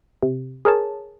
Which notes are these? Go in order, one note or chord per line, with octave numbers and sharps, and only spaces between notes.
C3
G#4 A#4 C#5 A5